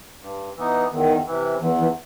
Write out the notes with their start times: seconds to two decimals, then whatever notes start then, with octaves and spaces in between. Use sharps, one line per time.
0.22 G2
0.57 E3 B3 D#4
0.91 E2 D#3
1.27 C3 E3
1.61 E2 E3
1.79 E3